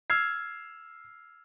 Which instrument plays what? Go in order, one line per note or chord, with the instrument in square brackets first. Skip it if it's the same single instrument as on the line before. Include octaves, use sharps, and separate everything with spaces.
[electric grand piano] E6 F6 G#6 C7